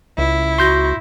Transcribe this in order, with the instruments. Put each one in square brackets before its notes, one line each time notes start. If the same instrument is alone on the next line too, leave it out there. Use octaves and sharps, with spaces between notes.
[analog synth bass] C#2 [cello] E4
[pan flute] F#4 [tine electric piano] C6 G6 A#6